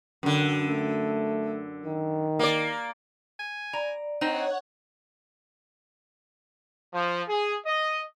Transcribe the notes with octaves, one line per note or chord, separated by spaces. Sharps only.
F#2 D3
A3
D#3
A#3 D5
G#5
D5 A#5
C4 D#4 C#5 D#5 F#5
F3
G#4
D#5